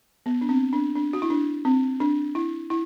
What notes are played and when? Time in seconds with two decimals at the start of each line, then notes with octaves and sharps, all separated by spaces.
0.26 B3
0.41 D4
0.49 C4
0.73 D4
0.95 D4
1.13 F#4
1.22 E4
1.30 D4
1.65 C4
2.00 D4
2.35 E4
2.70 E4